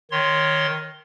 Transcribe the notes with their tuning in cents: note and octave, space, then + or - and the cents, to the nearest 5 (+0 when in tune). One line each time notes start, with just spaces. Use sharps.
D#3 +0 C#5 +0 C6 +0